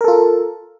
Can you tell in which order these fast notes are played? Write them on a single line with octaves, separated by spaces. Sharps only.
A#4 A4 F4